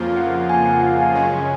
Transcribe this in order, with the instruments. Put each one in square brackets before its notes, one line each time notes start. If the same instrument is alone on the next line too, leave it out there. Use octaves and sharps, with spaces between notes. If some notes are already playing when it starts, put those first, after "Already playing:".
Already playing: [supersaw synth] F2 C#3 F3 A#3 F4
[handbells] F#5
G#5
F#5
F5
G#5
[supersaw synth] F#2 C#3 G#3 C#4